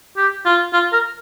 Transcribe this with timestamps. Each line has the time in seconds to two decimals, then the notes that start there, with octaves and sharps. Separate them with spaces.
0.17 G4
0.45 F4
0.73 F4
0.93 A#4